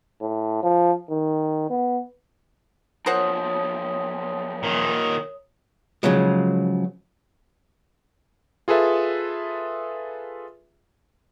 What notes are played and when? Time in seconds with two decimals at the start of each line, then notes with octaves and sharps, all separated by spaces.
0.21 A2
0.63 F3
1.10 D#3
1.70 B3
3.06 B1 F3 A#4 C5 C#5 F#5 D#6
4.63 A#2 D#3
6.03 C#3 F3 F#3 G#3
8.68 F4 G#4 A4 B4 E5